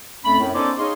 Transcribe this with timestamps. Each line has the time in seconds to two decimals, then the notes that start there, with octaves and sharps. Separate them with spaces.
0.24 F2 A3 C#4 B5
0.39 F#2 A2
0.53 B3 C#4 D#4 A4 C5 D5
0.78 D#4 G#4 C#5 D#5 F5 C6